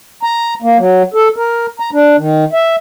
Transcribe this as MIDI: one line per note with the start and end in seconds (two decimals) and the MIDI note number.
0.23 0.54 82
0.62 0.77 58
0.78 1.03 54
1.14 1.28 69
1.36 1.66 70
1.80 1.90 82
1.92 2.16 62
2.17 2.45 51
2.53 2.76 76